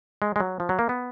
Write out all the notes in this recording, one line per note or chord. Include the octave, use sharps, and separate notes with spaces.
G#3
G#3
F#3
F3
F#3
A#3
B3